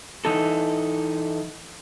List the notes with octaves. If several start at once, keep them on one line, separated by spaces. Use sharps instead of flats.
E3 D#4 A4